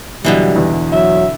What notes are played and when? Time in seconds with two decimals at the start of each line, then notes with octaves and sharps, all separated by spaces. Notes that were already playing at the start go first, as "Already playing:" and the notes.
0.25 B2 D3 E3 F#3 G3
0.56 E2
0.92 F#3 E5